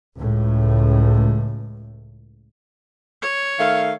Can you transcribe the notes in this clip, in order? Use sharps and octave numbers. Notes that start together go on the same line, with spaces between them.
C#2 A2
C#5
D#3 A3 F5